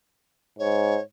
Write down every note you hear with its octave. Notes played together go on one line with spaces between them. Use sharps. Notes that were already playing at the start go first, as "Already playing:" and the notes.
G#2 C#5